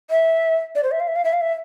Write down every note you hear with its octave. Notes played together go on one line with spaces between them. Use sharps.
E5
D5
C5
E5
F5
E5
F5
E5
F5
E5